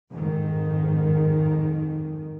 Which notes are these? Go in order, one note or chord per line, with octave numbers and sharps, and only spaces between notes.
F2 G#2 D#3